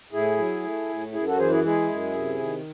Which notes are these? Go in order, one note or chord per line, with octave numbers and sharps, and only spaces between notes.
A2 E4 G#4
F#3
A3
A2
F#2 E4 G#4
F#4 A4
E3 G#4 C5
E4 G#4
G#3 E4 G#4
F#2
C3
D#3